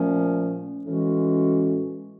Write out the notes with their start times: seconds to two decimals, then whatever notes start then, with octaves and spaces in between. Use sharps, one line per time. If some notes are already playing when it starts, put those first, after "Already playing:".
Already playing: A#2 F3 A3 C#4
0.85 A2 E3 G#3 C#4 F#4